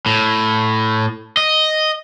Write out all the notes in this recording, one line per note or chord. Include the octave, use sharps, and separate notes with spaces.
A2
D#5